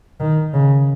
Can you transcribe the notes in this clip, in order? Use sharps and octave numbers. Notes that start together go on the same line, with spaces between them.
D#3
C#3